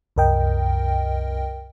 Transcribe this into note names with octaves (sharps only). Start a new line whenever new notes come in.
C2 F#2 A#4 D#5 G5